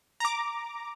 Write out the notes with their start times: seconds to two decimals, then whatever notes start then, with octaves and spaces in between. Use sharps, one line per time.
0.20 A#5 D6